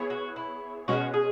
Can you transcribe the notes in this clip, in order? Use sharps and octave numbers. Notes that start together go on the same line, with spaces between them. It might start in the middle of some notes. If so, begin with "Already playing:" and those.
Already playing: B3 E4 G#4 C#5
F#4
E4
B2 G#3 C#4 F#4
G#4